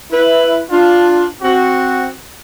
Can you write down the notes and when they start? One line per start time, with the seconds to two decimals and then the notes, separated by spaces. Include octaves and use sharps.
0.11 E4 B4
0.70 D4 F4
1.42 C4 F#4